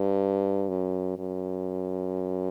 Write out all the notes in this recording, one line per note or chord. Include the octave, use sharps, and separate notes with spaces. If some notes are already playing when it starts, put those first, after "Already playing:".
Already playing: G2
F#2
F#2